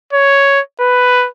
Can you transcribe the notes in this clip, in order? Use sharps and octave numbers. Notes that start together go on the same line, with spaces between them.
C#5
B4